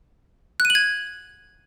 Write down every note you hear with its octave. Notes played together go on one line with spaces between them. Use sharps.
F#6
D#7
F#7
G#6